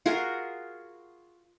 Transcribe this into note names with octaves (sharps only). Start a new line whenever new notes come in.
F4 F#4 G#4 A#4